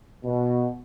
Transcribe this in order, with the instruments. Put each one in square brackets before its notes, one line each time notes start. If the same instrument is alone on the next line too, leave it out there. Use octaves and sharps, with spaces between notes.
[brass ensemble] B2